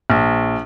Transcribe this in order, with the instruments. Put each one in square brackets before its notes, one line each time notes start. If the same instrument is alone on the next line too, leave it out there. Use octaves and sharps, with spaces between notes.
[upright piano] A#1